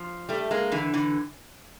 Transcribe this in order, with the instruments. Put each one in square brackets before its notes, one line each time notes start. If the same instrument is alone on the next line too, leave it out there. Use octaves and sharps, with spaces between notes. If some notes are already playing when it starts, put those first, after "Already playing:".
Already playing: [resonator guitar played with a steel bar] F3
G3 A3
G#3 A#3
D3 E3
D3 E3